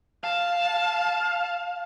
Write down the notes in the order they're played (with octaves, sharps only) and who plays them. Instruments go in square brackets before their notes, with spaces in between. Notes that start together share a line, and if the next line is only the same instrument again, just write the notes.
[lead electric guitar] F5 [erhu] A5